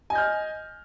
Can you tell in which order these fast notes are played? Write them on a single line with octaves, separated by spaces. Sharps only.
G#5 D#5 G6 F6